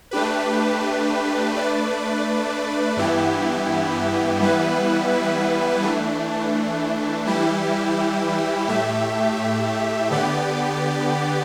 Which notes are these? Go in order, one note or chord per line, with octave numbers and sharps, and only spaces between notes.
A3 D4 G4 B4
A3 D4 B4 D5
G2 E3 B3 E4 G4
E3 G3 B3 E4 B4
E3 A3 D4
E3 G3 E4 G4
A2 A3 G4 E5
D3 B3 G4 D5